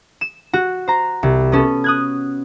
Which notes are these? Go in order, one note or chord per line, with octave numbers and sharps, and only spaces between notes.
E7
F#4
C5 A#5
C2
B3 C#4 A4
D#6 F#6 G#6